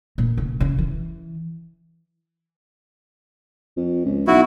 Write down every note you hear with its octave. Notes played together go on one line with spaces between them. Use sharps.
A#2
C#3
C#3
E3
F2
C#2
B1 E4 F#4